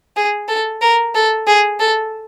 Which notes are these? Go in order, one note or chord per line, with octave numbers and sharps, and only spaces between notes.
G#4
A4
A#4
A4
G#4
A4